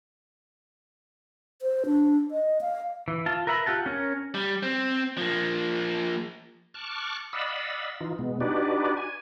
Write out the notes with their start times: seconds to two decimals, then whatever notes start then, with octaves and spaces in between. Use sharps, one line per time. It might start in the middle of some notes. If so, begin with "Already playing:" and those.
1.62 C5
1.86 D4
2.31 D#5
2.61 F5
3.08 E3
3.26 F4 A5
3.47 A#4 B4 E5 A#5 B5
3.66 F4 G4 F#5 A5
3.86 C#4 A#4 C#5
4.34 G3
4.63 C4
5.18 F3 A#3
6.74 A5 C#6 D6 F6 F#6
7.33 D5 D#5 F5 F#5 B5 E6
8.01 E3 D#4 F4
8.18 B2 G#3 B3
8.40 D4 D#4 F#4 G4 B4 D5
8.97 G#5